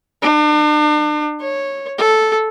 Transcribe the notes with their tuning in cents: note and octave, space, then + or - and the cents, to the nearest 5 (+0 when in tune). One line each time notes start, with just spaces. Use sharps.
D4 +40
C#5 -10
A4 -5